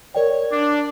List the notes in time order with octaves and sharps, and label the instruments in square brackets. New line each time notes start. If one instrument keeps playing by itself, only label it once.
[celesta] A#4 D5 G5 [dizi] C#5
[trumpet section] D4 [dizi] D6